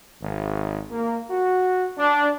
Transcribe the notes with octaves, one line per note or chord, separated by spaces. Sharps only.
G#1
A#3
F#4
D4